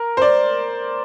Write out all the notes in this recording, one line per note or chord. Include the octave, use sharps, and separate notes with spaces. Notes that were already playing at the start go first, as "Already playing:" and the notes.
Already playing: A#4
C5
D5